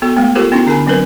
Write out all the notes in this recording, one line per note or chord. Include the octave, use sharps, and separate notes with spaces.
B3 F#4 A4
G#3 A3 B3
F4 G4 A4 A#4 C5 F#5
B3 C#4 D4 E4 F#4
D3 D4 G#4 A#4 G#5 B5
F#3 C4 D4 A#4 B4